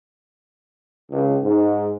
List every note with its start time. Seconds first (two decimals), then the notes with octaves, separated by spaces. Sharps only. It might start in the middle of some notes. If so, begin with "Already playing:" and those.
1.11 C#2
1.44 G#2